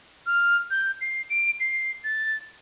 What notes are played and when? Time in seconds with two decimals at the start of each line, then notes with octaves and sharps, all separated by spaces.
0.26 F6
0.71 G6
1.01 C7
1.30 D7
1.60 C7
2.04 A6